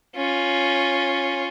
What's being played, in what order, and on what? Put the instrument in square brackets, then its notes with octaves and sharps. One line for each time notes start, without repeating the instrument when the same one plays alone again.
[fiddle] C#4 F4